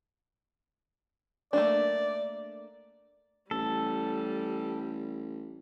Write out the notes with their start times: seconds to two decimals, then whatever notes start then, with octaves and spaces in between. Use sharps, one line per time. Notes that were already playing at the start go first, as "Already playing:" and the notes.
1.53 A3 A#3 D4 D5
3.51 A1 G3 A4